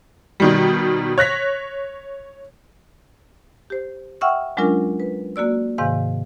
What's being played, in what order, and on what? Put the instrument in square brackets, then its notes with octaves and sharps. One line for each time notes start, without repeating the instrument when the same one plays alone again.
[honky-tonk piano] B2 D#3 G3
C#5 F#6 A#6 B6
[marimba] G4 C5
E5 F#5 G5 C#6 E6 F6
F#3 G#3 C#4 D4 F4 A#4
B4
A#3 F#4 D5 E6
G#2 C3 D#3 F5 G#5 G6